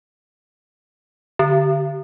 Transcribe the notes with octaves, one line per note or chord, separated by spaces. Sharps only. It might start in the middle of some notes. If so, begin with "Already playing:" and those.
D3